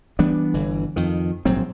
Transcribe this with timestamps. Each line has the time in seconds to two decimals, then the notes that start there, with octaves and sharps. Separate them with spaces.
0.19 E3 G3 B3 D4
0.54 G1 D3 E3
0.96 F2 D#3
1.45 A#1 G#2 F#3 C4